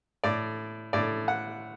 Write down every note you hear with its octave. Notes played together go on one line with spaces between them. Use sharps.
A2 D5
A2 D5
F#5